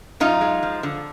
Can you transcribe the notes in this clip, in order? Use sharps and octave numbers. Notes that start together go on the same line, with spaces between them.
F#2 D#4 F4
G#3
F3
D3